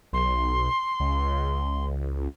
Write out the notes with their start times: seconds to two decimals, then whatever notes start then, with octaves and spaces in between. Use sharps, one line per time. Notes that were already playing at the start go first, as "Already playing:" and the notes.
0.13 B1 C6
1.00 C#2